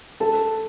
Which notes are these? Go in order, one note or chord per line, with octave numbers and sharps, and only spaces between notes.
A4 A5